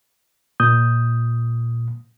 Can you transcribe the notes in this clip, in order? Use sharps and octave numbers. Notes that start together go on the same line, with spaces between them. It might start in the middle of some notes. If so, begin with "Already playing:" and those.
A#2 D#6 G6